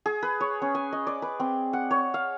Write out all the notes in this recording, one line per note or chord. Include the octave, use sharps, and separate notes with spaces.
G#4
B4
C#5
C#4
G#5
D#5
D5
B4
C4
F#5
C#5
F5